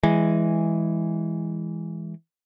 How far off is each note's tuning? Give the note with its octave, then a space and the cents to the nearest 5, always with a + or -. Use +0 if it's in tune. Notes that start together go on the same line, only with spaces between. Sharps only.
E3 +0 G#3 -10